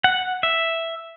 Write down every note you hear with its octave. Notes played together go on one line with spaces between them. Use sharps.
F#5
E5